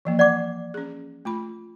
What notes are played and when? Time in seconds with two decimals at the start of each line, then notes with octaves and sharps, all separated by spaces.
0.05 E3 F3 A#3
0.19 D5 F#5 D6
0.74 C#4 G#4
1.25 A3 F4 B5